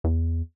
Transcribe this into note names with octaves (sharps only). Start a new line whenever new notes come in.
E2